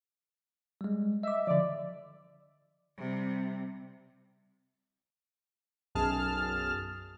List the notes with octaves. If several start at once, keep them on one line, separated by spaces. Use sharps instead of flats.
G3 G#3
D#5 E5 D6
D3 F3 D5
C3 G3
B1 F#2 G#4 A5 F6